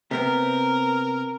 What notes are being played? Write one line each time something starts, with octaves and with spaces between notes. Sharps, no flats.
C3 B3 C4 A#4